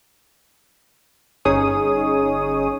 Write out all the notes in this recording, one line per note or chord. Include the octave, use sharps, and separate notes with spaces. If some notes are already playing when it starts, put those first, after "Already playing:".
G1 C#4 D#4 G#4 C#5 D#6